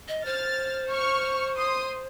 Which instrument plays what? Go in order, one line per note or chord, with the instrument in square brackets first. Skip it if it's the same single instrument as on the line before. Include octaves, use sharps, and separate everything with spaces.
[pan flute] D#5
[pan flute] C5 [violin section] F6 A6
[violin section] C#6 F6
C6 D#6